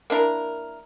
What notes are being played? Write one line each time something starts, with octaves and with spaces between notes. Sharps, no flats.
A#3 D4 E4 A#4